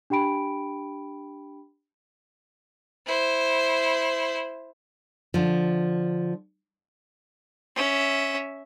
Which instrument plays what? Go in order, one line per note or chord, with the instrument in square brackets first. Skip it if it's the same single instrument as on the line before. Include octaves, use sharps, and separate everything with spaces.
[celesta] D4 G4 G5 B5 D7
[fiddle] E4 C5
[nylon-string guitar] D3 F3
[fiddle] C#4 E5